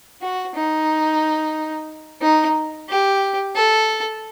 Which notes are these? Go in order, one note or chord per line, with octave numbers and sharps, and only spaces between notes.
F#4
D#4
D#4
G4
A4